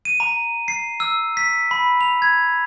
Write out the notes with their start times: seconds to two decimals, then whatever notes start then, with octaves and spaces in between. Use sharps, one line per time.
0.05 D#7
0.20 A#5
0.68 C7
1.00 E6
1.37 B6
1.71 B5
2.01 F7
2.22 G#6